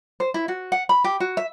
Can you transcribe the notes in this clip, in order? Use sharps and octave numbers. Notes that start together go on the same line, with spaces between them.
C5
E4
F#4
F#5
B5
G4
F#4
E5